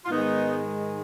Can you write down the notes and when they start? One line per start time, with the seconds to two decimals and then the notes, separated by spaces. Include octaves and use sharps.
0.05 F4
0.10 G#2 D#3 G#3 B3 D#4